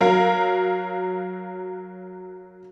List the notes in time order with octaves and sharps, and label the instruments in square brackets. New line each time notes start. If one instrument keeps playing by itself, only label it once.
[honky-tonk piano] F#3 A#4 F5